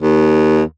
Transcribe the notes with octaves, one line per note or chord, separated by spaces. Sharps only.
D#2